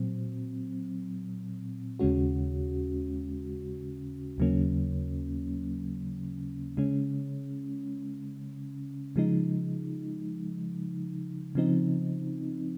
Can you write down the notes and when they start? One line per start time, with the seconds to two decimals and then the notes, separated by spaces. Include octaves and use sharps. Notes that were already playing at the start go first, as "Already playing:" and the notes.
Already playing: A#2 F#3 C4
2.00 D#2 C#3 G#3 C#4 F#4
4.38 D#2 C#3 F#3 A#3 C#4
6.77 C#3 G#3 C#4
9.16 C#3 F3 G#3 D#4
11.55 C#3 F3 C4 D#4